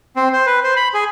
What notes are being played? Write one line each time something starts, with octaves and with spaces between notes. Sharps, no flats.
C4
C5
B4
C5
B5
G#4